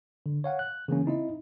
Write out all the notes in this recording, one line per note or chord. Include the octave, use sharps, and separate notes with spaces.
D3
C#5 F5 F#5
F#6
C#3 E3 A#3 C#4
C4 D#4 E4 D#5